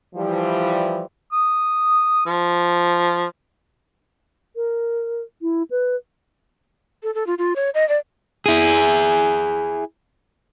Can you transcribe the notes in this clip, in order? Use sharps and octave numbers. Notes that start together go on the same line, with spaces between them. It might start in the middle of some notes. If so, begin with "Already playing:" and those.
E3 F3 G3
D#6
F3
A#4
E4
B4
A4
A4
F4
F4
C#5
D#5
D5
E4 G#4